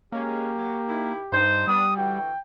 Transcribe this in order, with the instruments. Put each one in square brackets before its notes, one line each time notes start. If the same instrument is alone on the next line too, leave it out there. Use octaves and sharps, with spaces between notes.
[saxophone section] G#3 C#4 [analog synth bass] A#3 [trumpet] G4
[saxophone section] F#3
D#3 E4
[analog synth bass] G2 [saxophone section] D#4 C5
[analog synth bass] G3 [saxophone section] B3 D4 [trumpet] D#6
[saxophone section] D2 E3 F#4 [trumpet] G5